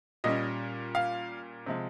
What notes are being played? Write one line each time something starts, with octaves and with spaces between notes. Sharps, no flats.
A#2 G3 C#4 D#5
F5
C3 F3 G#3